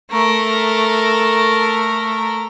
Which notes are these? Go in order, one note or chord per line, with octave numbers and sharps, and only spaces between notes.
A3 A#4